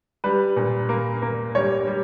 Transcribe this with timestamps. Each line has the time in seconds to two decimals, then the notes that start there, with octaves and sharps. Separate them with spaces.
0.24 G3 B4
0.56 A#2
0.89 A#3
1.22 A#3
1.55 G3 C#5
1.87 G3